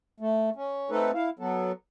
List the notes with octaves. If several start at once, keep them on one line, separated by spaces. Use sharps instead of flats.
A3
C#4
A3 C4 D#4 A4 B4
E4 F5
F#3 B3 A4